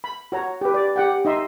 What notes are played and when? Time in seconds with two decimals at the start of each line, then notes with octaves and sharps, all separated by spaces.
0.04 B5
0.32 F#4 C#5 A#5
0.61 G4 B4
0.74 D5
0.96 G4 F#5 G5
1.25 D#4 D#5 E5 C6